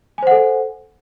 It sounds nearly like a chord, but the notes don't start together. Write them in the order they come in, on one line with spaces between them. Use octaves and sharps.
G#5 C5 F#5 A4